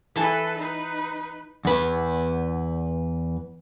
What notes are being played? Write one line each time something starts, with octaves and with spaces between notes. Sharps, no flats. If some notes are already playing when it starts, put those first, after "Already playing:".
E3 A4 B4 A5
D#4 B4
E2 B4